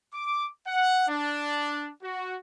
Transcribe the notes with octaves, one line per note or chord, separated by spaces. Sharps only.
D6
F#5
D4
F#4